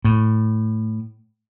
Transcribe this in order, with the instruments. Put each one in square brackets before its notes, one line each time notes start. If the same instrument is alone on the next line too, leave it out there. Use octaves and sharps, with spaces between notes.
[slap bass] A2